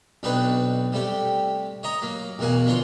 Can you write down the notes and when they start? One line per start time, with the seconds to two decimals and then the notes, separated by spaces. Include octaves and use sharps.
0.23 B1 B2 C4 D4 D#4 B4
0.93 C3 G3 A3 G4
1.83 C#5 D#5 A#5 D#6
2.02 F#3 A#3
2.39 B1 E2 A#3 F#4 A#4 G#5
2.66 D3 F3 F4 C#5 C6